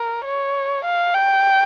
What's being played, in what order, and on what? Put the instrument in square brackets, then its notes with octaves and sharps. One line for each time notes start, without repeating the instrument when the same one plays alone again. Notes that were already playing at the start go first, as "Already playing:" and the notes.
Already playing: [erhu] A#4
C#5
F5
G5